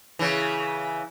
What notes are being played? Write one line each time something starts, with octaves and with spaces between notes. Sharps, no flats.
C#3 E3